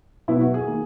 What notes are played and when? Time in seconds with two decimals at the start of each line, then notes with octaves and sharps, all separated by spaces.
0.28 B2 F#3 B3 E4
0.41 F#4
0.54 G#4
0.67 D#3 A#3